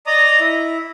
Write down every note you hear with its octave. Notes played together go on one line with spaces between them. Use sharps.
D5 D#5 A#5 D#6
E4